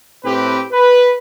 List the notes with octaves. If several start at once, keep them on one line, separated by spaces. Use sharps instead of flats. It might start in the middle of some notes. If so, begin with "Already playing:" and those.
A2 C4 G4 B4
B4